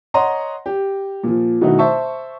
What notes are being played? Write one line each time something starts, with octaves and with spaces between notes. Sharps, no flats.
C#5 D#5 F#5 A#5 C6
G4
A#2 F3
B2 D#3 A3 D#4 E4 F#4
C5 E5 A5 C#6